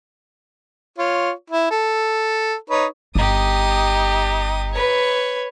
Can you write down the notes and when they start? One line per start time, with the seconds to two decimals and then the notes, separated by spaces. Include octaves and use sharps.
0.98 F4 C#5
1.50 E4
1.71 A4
2.70 D#4 B4 C#5
3.15 G1 D#4 G4 D#6
4.73 B4 C#5